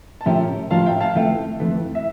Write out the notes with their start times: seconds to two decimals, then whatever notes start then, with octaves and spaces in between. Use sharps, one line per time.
0.21 A5
0.26 A2 F3 C#4 G4 A#4 E5 G5
0.70 A2 F3 C#4 G4 A#4 F5 A5
0.86 E5 G5
1.00 F5 A5
1.15 F2 E3 A3 E5 G5
1.60 F2 E3 A3
1.95 E5